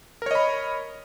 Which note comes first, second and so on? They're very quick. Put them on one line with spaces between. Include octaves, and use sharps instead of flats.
A#4 C#5 D#5 B5